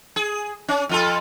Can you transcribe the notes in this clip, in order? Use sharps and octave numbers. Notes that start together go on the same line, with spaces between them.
G#4
C#4
F2 F4 A4